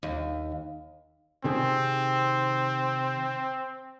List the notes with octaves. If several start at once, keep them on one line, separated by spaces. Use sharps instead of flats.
D#2
C3 D#3 C4 G#4